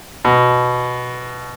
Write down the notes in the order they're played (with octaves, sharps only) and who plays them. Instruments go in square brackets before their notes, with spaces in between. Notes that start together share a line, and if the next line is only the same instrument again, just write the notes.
[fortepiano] B2